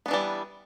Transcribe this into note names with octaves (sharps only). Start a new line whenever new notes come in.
E3 G3 B3 D4